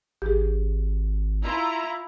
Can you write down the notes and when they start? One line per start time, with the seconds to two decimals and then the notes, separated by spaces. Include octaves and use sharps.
0.22 G#1 G4 G#4
1.44 E4 F4 A#5